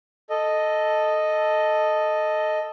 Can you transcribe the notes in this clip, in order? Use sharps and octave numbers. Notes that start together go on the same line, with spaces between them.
A4 D#5